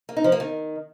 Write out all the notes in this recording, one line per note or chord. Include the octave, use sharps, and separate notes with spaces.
A#3
D#4
F3
A#3
D#3